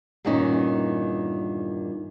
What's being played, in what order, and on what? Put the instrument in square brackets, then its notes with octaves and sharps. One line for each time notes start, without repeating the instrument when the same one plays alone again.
[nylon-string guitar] E2 G2 A#2 D#3 C#4 D#4